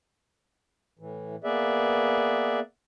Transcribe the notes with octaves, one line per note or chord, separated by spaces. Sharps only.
A2 E3
A#3 B3 G#4 B4 D5 E5